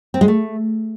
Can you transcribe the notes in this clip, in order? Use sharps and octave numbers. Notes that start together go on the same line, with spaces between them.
C4
G#3
A3